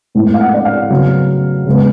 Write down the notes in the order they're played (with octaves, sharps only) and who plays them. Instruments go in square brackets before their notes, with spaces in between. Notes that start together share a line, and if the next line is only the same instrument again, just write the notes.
[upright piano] A2 G#3 B3
F5
F#5
D5
F5
C#3 F#3 B3
C#3 G#3 B3